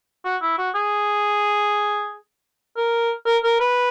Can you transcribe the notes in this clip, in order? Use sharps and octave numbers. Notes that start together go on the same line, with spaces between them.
F#4
E4
F#4
G#4
A#4
A#4
A#4
B4